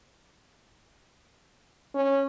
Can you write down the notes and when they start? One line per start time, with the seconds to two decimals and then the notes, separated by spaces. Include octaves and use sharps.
1.95 C#4